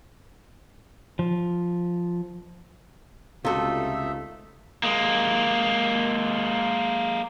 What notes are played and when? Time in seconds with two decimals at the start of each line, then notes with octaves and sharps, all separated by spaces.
1.19 F3
3.45 C#2 C3 A3 D#4 F4 F#4 A4 E5
4.83 G#3 A#3